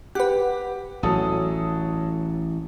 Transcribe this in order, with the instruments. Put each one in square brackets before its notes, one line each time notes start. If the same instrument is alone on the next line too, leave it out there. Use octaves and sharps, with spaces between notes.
[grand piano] G4 [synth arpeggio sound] B4 F#5
[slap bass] A1 [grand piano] F#3 A4 D#6